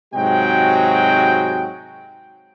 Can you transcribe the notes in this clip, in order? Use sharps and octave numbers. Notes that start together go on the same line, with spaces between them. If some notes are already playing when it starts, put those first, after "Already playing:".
G#2 C3 F#3 G#3 F#4 G5